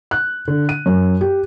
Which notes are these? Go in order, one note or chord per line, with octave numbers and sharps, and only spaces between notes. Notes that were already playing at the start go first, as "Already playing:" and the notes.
F#6
D3
D#7
F#2
G4